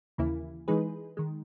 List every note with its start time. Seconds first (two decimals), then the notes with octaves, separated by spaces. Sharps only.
0.18 D#2 C#3 E3 A#3 E4
0.68 E3 G#3 D#4 G#4 B4
1.17 D#3 G#3